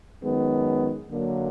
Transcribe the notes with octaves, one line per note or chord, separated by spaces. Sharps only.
F#2 D#3 G#3 B3
D3 F#3 A#3